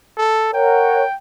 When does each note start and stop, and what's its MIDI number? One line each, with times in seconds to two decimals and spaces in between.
0.17 0.51 69
0.54 1.04 70
0.54 1.04 73
0.54 1.04 78
0.54 1.15 79